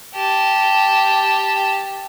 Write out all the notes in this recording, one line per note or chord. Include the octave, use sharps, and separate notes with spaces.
G4 A5